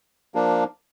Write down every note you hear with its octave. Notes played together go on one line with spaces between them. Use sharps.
F3 A#3 D4